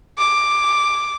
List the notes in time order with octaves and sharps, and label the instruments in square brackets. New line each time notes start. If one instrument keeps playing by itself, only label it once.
[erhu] D6